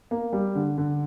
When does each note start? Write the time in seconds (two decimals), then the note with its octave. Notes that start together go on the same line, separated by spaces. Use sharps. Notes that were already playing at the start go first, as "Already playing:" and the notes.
0.11 A#3
0.33 G3
0.55 D3
0.78 D3